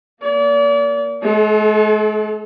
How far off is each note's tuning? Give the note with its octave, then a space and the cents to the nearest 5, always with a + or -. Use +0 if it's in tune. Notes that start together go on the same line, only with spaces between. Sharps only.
A#3 +0 D5 -40
G#3 +40 A4 -30